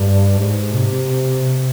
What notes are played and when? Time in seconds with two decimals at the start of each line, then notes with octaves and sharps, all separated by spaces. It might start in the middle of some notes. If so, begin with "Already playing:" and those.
Already playing: G2
0.37 G#2
0.73 C3